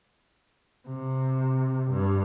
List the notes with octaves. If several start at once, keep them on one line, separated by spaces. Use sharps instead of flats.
C3
G2